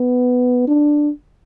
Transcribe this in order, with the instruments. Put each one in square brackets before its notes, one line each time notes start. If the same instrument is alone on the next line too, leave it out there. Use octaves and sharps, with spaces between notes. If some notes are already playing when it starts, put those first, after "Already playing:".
Already playing: [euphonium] B3
D4